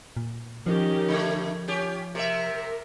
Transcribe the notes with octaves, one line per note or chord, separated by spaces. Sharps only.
A#2
D#3 F3 C#4 G4
D3 A3
C#4 F4 G4
C3 A#4 E5